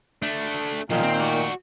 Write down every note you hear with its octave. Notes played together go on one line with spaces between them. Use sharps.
A3 D4
B1 A#2 D#3 F3
C4
F#4 D5